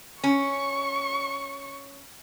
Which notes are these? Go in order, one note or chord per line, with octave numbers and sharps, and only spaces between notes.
C#4 C#6